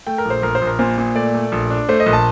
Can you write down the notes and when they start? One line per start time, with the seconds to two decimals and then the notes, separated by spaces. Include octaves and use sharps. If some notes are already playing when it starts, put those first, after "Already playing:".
0.07 A3 G5
0.18 A#4
0.25 A#1
0.30 C5
0.42 A#1 A#4
0.55 C5
0.62 A#1
0.67 A#4
0.79 A#2 C5
0.98 A#2
1.15 A3 D5
1.34 A3
1.52 A#1
1.70 D4
1.89 A3 C5
2.00 D#5
2.06 A#1
2.13 A5